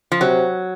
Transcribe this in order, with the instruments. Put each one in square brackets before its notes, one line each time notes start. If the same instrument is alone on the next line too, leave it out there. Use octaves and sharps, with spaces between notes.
[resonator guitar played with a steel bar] F3
[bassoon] C3 [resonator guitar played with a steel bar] F#3